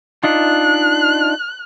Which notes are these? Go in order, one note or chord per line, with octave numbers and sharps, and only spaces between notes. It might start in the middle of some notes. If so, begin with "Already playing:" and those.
D4 D#4 F4 F#6